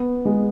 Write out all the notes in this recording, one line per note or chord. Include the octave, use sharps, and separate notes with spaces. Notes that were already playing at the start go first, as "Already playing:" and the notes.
Already playing: B3
G#3